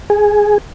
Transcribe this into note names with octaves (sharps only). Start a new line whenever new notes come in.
G#4